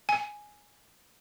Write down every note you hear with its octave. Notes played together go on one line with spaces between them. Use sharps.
G#5